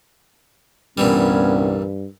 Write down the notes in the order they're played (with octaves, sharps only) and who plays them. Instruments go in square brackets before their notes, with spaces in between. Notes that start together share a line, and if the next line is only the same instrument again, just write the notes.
[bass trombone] C2 [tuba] G2 [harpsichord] A#2 E3 G3 [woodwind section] B3 C#4